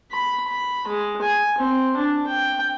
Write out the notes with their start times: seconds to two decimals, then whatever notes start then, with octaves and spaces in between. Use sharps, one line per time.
0.11 B5
0.48 B5
0.88 G#3
1.21 G#5
1.58 C4
1.96 D4
2.27 G5